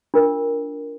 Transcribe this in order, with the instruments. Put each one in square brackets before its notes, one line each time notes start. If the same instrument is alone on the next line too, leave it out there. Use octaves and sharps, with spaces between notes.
[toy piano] D4 F4 A#4